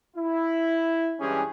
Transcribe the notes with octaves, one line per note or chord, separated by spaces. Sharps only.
E4
G2 E3 G#3 C#4 G4 G#4